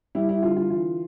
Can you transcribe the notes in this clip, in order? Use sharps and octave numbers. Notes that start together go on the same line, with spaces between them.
G3 E4
E4
D3 F4
F4
E3 F4